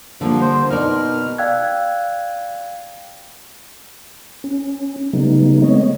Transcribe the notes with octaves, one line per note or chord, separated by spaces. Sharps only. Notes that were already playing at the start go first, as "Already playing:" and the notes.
D3 F3 G3 A#3
C5
B2 D#4 A#4 D5 F6
D5 F5 G5 E6 F#6 G#6
C#4
C#3 F#3 G3 A3 B3 D#4
G#3 A3 B3 C4 C#5 D#5